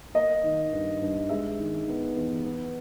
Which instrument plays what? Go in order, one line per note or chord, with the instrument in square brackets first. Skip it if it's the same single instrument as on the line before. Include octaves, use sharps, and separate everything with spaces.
[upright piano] A#3 D#5
D#3
G2
G2
G#3 E5
D#3
B3
E2
B3